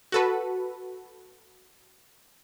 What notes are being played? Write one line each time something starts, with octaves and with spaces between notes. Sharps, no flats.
F#4 A4 B4